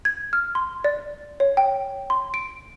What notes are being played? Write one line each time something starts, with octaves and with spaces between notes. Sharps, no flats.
G#6
F6
C6
D5
C#5
G5
C6
D7